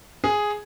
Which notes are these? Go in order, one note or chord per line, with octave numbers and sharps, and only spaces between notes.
G#4